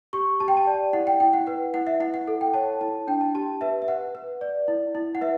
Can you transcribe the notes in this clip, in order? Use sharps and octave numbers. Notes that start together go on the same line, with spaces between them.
G4 C#6
G4 A5
G5
A5
D5
E4 F#5
G5
E4 G5
F#5
B4 F#5
E4 F#5
E5
E4 F#5
F#5
A4
G5
C#5 A5
E4 A5
D4 G5
A5
G4 A5
B4 E5
E5
B4 F#5
B4
D5
E4
E4
F#5
B4 E5